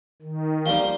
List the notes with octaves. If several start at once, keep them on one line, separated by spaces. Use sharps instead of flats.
D#3
F3 G3 A#3